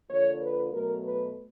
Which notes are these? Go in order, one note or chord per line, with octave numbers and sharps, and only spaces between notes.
D3 F3 A#3 C#5
B4
B2 F#3 A3 A#4
B4